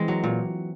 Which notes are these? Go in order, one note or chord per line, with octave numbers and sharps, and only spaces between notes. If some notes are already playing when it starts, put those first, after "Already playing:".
Already playing: E3 G#3 C4
F#3
A#2